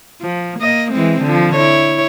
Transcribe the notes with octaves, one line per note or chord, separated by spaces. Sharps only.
F3
A#3 D#5
E3 G#3 C4
D3 F3
E4 C#5